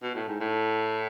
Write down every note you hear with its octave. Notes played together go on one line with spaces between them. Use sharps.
B2
A2
G#2
A2